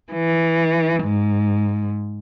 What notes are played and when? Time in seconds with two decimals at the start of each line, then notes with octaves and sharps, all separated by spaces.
0.12 E3
1.04 G#2